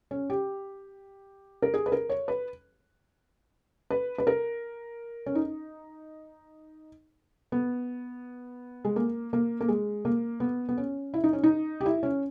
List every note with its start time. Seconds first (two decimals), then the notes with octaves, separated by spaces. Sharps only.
0.11 C#4
0.30 G4
1.62 A#4
1.74 G#4
1.86 B4
1.92 A#4
2.10 C#5
2.28 B4
3.90 B4
4.18 B4
4.27 A#4
5.26 C#4
5.35 D#4
7.52 B3
8.85 G#3
8.96 A#3
9.33 A#3
9.61 A#3
9.68 G#3
10.05 A#3
10.40 B3
10.69 B3
10.77 C#4
11.14 E4
11.24 D#4
11.33 C#4
11.43 D#4
11.81 G4
11.86 E4
12.03 C#4